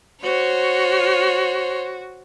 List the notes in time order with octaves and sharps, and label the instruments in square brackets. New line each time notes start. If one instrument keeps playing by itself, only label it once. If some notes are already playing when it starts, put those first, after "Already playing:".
[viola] F#4 [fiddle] C5 C#5